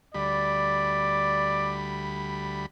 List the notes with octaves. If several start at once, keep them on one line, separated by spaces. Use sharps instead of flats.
D2 G3 D5 B5